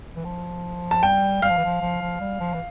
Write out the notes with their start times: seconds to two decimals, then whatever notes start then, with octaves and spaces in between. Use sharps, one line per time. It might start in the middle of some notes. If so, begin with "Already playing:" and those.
0.16 E3
0.25 F3
0.91 A5
1.03 G3 G5
1.42 G3 F5
1.50 F3
1.57 E3
1.65 F3
1.81 F3
2.01 F3
2.21 G3
2.40 F3
2.54 E3